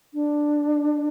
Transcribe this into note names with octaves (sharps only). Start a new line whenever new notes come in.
D4